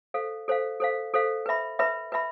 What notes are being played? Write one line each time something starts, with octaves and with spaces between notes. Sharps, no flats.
A4 C5 F5
A4 C5 F5
A4 C5 F5
A4 C5 F5
B4 E5 B5
B4 E5 B5
B4 E5 B5